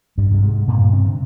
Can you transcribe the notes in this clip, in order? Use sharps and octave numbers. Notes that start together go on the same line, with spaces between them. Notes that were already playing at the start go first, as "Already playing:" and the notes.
G2 G3
C3 G3
G#2 G#3
G2 A#2 A#3
C3 C4
D3